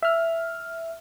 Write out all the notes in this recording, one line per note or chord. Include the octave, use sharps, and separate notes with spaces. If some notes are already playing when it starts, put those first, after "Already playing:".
E5 F6